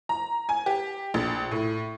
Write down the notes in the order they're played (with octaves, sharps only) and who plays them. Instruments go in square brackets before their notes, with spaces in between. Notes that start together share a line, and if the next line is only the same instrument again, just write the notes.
[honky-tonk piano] A#5
G#5
G4
A#1
A2